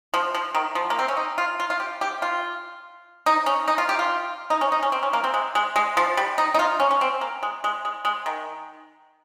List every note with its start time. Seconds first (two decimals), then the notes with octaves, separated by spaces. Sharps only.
0.14 F3
0.35 F3
0.55 D#3
0.75 F3
0.90 A#3
0.99 C4
1.08 C#4
1.17 D#4
1.38 F4
1.60 F4
1.70 F4
1.80 G4
2.01 G4
2.22 F4
3.26 D#4
3.46 C#4
3.68 D#4
3.78 F4
3.89 G4
3.99 F4
4.50 D#4
4.61 C#4
4.72 D#4
4.83 C#4
4.92 C4
5.03 C#4
5.13 A#3
5.24 C4
5.34 G#3
5.55 G#3
5.76 G#3
5.97 F3
6.17 G3
6.38 D#4
6.54 D#4
6.59 F4
6.80 C#4
6.91 C#4
7.01 C4
7.21 A#3
7.43 G#3
7.64 G#3
7.85 G#3
8.05 G#3
8.26 D#3